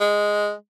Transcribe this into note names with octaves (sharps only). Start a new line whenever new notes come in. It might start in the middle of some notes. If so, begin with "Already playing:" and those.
G#3